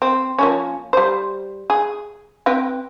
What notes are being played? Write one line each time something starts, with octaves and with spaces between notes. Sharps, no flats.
C4
F3 A#3 C#4
G3 C5
G#4
C4 B4 G5